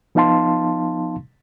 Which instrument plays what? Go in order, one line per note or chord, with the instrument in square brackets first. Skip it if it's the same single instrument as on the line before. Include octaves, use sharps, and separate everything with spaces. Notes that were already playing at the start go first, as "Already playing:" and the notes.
[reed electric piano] F3 B3 D#4 F5 A5 C6